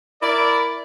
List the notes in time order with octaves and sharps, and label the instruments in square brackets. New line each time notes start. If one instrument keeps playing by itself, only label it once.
[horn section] E4 A#4 D5